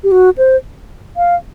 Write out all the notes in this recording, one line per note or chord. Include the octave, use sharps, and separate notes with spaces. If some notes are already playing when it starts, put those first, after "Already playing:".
G4
F#4
C5
F5